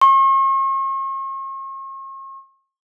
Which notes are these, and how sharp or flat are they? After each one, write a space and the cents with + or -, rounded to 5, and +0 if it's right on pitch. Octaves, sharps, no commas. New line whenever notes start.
C#6 -45